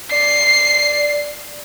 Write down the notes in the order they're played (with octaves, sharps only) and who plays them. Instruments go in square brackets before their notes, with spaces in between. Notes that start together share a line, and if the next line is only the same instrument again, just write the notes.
[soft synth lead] D5 [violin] C7